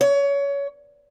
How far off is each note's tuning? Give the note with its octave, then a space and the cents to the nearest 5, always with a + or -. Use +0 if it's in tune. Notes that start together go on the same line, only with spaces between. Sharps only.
C#5 +25